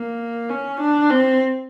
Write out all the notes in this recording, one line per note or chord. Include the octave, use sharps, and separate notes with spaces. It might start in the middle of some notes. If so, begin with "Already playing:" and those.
Already playing: A#3
C#4
D4
C4